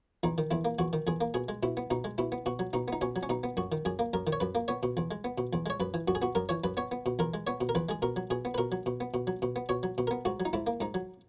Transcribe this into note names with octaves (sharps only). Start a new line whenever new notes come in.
E2 D#4
D#3
E2 E4
A#3
E2 F#4
D#3
E2 G#4
A#3
B2 G#4
G#3
B2 E4
B3
B2 D#4
G#3
B2 E4
B3
B2 F#4
F#3
B2 D#4
B3 D#4
B2 C#4
F#3
C#4
B2 D#4
B3
F#2 F#4
D#3
F#2 G#4
A#3
F#2 A#4
D#3
C#5
F#2 B4
A#3
B3 C#5
B2
E2
G#3
B3
B2
E2
G#3 C#5
F#2 B4
E3
F#2 F#4
G#4
B3 F#4
F#2 A#4
E3 C#5
F#2 B4
B3 C#5
B3
B2
E2 A#4
G#3
B3 C#5
B2
A#4
E2 B4
G#3 G#4
B2 A#4
F#3
B2 G#4
B3
B4
B2 A#4
F#3
B2
B3
B2
F#3
B2
B3
B2 C#5
F#3
B2
B3 A#4
G#2 F#4
F#3
D#4
G#2 E4
A#3
G#2 D#4
F#3